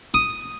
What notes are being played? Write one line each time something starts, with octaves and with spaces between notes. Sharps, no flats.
D#6